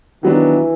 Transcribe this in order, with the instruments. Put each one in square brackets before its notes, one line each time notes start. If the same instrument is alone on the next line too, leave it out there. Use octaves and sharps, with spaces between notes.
[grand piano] D#3 F#3 B3 D4 [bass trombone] E3